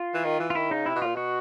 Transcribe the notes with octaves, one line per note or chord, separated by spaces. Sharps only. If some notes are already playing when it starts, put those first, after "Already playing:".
Already playing: F4
E3
D#3
E3
F4
D#3 E4
C#3 D#4
C3 E4
B2
A#2 F4
B2 F#4